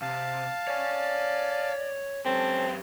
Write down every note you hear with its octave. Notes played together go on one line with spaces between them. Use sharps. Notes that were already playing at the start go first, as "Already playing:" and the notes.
C3 F5 A5
C#5 D5 G#5
F#2 C4 C#4 G4 A4 A5